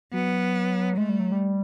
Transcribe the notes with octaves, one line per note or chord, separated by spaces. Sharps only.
F#3 B3
G#3 A3
G3
F#3
G3